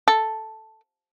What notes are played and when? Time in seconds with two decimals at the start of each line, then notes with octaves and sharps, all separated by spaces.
0.08 A4